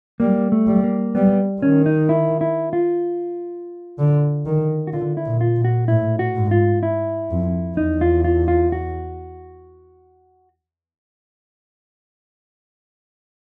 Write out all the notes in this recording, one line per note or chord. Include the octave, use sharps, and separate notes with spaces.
G3 A#3
A3
G3
A#3
G3 B3
D#3 C#4
D#4
E4
E4
F4
D3
D#3
F#4
D3 F4
E4
A#2
F4
A#2
F#4
A2 E4
F#4
G#2
F4
E4
F2
E2 D#4
F4
F4
F4
F#4